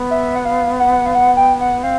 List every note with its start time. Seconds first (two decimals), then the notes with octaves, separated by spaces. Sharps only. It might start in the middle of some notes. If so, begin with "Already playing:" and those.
Already playing: B3
0.11 E5
0.36 F#5
0.45 F5
0.80 F#5
1.06 F5
1.15 F#5
1.37 G5
1.61 F#5
1.83 C4 F5